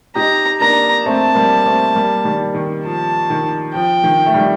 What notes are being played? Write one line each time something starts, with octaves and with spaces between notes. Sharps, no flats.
D#4 G4 A#5
A#3 D4 A#5
A3 C4 A5
G3 A#3
A3 C4
G3 A#3
D#3 G3
D#3
F3 A5
D#3
F3 G5
D#3
A3
D#3 G3